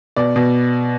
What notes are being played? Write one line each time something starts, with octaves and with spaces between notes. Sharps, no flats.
B2 D5
B2